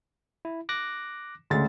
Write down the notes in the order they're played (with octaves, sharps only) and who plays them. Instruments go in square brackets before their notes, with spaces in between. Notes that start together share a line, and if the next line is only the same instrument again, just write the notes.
[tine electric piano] E4
D6 F#6 A#6
[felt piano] D2 C#3 A6 [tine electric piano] G#3